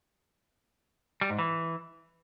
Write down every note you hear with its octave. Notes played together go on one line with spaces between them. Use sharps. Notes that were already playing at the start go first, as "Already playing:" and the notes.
G3
G#2
E3